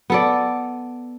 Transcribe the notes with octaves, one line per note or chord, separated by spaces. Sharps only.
B3 A4 D5